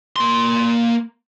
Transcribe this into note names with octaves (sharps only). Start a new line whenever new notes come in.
A#3 C6